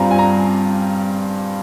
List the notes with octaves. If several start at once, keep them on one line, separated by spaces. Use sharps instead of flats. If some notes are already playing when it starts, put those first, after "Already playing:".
Already playing: G2 G3 C4 F4 G#5 A#5
G#5
A#5